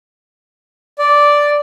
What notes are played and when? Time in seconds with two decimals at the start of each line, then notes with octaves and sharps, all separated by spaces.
0.99 D5